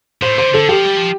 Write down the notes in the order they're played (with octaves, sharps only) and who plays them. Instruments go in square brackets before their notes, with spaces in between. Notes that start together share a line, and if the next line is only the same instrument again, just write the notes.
[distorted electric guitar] A2 [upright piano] C5
[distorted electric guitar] D3 [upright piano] C5
[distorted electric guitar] D3 [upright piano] A4
[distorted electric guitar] F3 [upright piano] G4
[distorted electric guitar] G3
F3